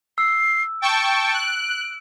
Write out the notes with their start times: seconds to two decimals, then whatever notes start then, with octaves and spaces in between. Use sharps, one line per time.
0.18 E6 C7
0.82 G5 A5 C#6 D7
1.33 F#6